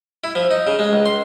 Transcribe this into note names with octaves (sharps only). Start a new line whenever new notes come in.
E4
F3
D#4
C#3
G#3
C#2
C6